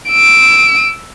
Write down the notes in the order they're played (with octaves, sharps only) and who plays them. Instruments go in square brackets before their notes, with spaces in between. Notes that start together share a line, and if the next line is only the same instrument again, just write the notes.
[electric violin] E6 D7